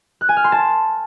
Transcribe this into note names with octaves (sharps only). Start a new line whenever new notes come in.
F#6
G#5
F6
C6
A5